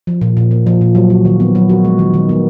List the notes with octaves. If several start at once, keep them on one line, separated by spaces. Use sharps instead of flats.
F3
A#2
A#2
A#3
F3
A#2
F#3
F#4
D#3
B3
F#3
F#4
G#3
D#3
D#3
B3